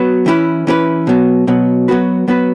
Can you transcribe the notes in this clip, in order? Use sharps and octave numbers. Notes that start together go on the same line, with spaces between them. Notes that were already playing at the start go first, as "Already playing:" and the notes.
Already playing: F#3 B3 F#4 B4
E3 C#4 E4 G#4 B4
E3 C#4 E4 G#4 B4
B2 F#3 B3
B2 F#3 B3
F#3 B3 F#4 B4
F#3 B3 F#4 B4